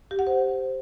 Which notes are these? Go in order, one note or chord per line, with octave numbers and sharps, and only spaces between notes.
G4
F#5
C5